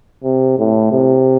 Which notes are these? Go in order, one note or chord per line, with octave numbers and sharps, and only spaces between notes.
C3
A2
C3